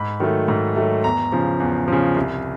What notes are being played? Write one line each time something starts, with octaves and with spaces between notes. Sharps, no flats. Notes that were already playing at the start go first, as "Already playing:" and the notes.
Already playing: G#2 B5
D#3 F#3 A3
G#2
D#3 F#3 A3
E2 A#5
C#3 F3
E2
C#3 F3
C2